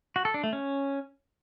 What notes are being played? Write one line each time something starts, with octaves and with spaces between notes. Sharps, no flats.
F#4
A4
D4
A3
C#4